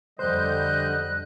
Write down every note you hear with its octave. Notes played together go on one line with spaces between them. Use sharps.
F2 D3 G3 C5 D#5 F#6 G6